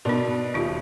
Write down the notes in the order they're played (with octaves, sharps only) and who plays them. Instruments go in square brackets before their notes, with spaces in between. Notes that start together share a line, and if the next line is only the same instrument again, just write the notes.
[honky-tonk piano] B2 [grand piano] D4 [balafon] D#4 A#4
[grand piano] D#1 [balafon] D#4 F4 G4